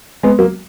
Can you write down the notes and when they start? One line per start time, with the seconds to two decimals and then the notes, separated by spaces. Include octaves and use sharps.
0.23 G#3 B3
0.39 F#3 A#3